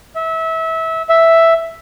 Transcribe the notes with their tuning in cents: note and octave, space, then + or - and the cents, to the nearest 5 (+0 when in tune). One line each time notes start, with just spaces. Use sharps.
E5 -25
E5 +0